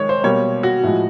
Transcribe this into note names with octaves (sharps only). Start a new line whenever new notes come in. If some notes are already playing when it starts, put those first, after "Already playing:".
Already playing: D#3 G#3 C#5
C5
B2 G3 A#3 C#5
F#4
A2 F3 G#3